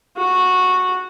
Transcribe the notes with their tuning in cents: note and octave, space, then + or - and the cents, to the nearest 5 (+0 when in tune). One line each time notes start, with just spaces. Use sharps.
F#4 -10